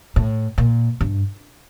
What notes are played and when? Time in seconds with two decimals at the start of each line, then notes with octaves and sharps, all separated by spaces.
0.16 A2
0.58 A#2
1.01 G2